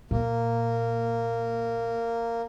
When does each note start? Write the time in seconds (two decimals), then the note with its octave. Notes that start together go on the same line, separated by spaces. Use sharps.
0.11 A#2 A#3